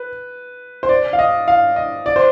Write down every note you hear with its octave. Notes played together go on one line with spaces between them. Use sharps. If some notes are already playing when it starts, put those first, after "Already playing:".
Already playing: B4
C5
D5
F5
D#5
F5
D#5
D5
C5